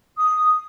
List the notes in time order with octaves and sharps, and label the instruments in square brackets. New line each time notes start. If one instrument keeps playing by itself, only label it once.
[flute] D#6